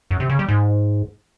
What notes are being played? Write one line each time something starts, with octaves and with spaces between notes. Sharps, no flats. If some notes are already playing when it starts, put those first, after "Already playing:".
F#2
C3
C#3
G3
G#2